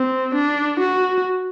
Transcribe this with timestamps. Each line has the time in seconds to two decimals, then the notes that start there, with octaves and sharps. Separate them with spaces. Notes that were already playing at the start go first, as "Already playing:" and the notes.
Already playing: C4
0.34 D4
0.80 F#4